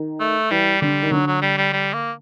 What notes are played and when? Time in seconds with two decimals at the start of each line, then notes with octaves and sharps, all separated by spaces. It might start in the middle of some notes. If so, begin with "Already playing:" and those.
Already playing: D#3
0.20 A3
0.51 E3 G3
0.81 D3 G3
1.03 D#3
1.11 D3 F#3
1.27 F#3
1.42 G3
1.58 G3
1.73 G3
1.94 A#3